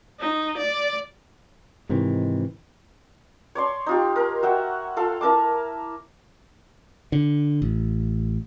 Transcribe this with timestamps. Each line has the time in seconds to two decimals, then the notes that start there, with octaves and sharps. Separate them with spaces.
0.20 D#4
0.58 D5
1.89 G#2 C3 D#3 E3
3.55 C#5 D5 C6
3.86 D#4 F4 G4
4.16 A#4
4.43 F#4 E5 F#5 G5
4.97 F4 A4 F5
5.21 E4 A#4 A5 D6
7.12 D3
7.62 A1